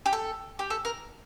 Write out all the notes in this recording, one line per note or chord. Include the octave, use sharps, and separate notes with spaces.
G4
A4
G4
A4
A#4